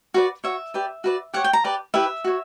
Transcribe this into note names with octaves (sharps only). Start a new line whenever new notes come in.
F#4 B4 D5
F#4 C#5 E5
G4 B4 D5
F#4 B4 D5
G4 C#5 F#5
G5
A#5
G4 B4 D5
E4 G4 B4 E5
F#4 C#5